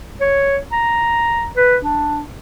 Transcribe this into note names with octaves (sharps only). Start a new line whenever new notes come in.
C#5
A#5
B4
D4